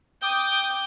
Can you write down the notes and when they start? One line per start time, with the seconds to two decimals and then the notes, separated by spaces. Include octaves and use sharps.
0.22 G5 D6 D#6 G6